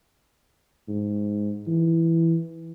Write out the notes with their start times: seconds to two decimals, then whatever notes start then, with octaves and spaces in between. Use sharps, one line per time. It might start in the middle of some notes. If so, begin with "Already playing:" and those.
0.88 G#2
1.67 E3